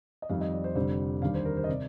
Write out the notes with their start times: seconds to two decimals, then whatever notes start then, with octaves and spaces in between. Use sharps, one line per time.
0.22 D#5
0.29 F2 D#3 G3 F5
0.41 D#5
0.53 D5
0.64 C5
0.76 F1 F2 D3 G3 C5
1.22 D#2 D3 G3 F5
1.34 C5
1.45 A#4
1.57 C5
1.64 D#5
1.68 C3 D5